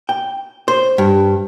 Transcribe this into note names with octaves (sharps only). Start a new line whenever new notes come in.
G5
C5
G2